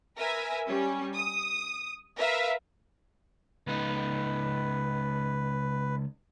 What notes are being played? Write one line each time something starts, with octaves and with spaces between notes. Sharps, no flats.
A#4 B4 E5 G#5
G3 C#4
D#6
A#4 B4 E5 F5
C#2 D#4 B4